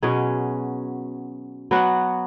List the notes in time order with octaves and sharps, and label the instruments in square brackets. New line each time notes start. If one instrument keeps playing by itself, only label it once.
[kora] B2 F#3 C#4 G#4
F#3 B3 F#4